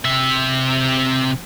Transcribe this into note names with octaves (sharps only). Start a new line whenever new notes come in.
C3 E5